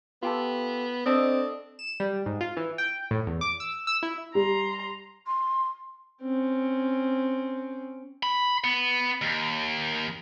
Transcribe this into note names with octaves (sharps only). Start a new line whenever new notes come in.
B3 F4 G4 A4
C4 D4 A4 D#5
E7
G3
G#2
F4
E3
G5
A2
E2
D6
E6
E6
E4
G3 A#5 C6
C6
C4 C#4
B5
B3
D#2